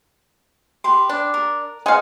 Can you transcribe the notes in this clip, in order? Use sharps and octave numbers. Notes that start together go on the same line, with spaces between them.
G4 B4 C6
D4
A#4
G#4 C5 D#5 F5 F#5